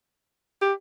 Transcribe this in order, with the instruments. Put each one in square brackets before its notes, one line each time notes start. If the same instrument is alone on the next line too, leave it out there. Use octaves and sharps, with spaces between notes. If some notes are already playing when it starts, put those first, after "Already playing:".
[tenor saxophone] G4